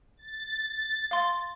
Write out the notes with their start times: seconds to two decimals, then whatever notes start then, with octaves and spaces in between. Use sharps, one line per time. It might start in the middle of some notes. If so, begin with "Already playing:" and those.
0.17 A6
1.11 F5 C6